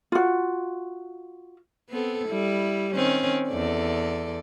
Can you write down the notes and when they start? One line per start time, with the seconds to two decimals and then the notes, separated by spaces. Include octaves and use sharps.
0.12 F4 F#4
1.89 B3 C4 A4
2.28 G3 E4
2.94 D#3 C4 C#4
3.49 E2 A4 D5